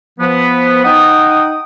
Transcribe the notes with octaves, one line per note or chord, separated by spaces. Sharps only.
F3 B3
D#4 F#5 G5 D#6